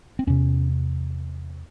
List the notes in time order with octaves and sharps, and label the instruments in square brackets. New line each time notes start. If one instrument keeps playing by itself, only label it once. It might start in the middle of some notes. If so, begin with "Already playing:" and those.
[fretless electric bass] C4
E2 C3 C#4